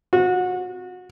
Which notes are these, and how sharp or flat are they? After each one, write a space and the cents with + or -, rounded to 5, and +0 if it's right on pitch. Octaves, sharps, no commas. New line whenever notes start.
F#4 -25